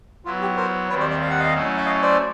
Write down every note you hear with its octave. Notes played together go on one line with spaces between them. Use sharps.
F#3 B3 E4 F4
G4
A#4 C5
D#2 D#3 G3 C4 B4 C#5
C5 D5
D5 E5
F5
F#5
D#5 F5
F#3 A3 C#4 E4 A4
E5
D#5 F5
C5 D5